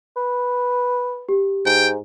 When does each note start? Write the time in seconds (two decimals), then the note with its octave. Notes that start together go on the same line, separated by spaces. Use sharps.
0.16 B4
1.29 G4
1.65 G#2 G5